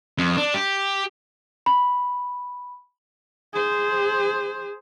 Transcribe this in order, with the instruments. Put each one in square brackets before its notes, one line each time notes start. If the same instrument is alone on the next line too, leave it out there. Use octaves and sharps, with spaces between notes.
[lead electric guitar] F2
D4
G4
[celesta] B5
[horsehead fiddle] G#4 C5